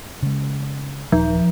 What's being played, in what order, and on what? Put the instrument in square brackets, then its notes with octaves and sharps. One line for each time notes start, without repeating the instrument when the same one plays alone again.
[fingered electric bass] C#3 G#3
[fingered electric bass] D#1 [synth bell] F3